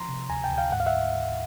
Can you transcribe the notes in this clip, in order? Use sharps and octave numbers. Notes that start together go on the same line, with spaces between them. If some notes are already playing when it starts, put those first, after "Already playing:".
Already playing: F3 A#5 C6
C3
D2 G#5 A#5
G5 A5
D2
F5 G5
G#2 F#5
F5
E5 F#5